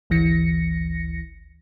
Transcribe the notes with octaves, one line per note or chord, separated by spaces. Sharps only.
G#1 D2 E3 A#6 C#7